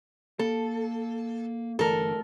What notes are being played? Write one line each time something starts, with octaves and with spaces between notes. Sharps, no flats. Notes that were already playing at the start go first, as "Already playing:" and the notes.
A#3 A4
G1 E3 A3 A4 A#4